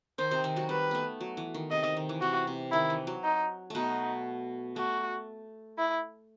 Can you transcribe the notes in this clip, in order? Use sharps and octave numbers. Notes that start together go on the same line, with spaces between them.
D#3 D#4 C5
C3 C4
D#3 D#4
F#3 F#4
G3 B4
A3 B3
F#3
E3
D#3
C3 D#5
D#3
D#3
E3
C3 F#4
C3
D#3 E4
E3
F#3
D#4
B2 A3 B3 D#4
A3 F#4
E4